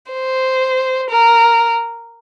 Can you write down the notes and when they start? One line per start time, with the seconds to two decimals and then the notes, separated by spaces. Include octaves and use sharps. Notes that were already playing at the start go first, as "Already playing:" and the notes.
0.12 C5
1.10 A#4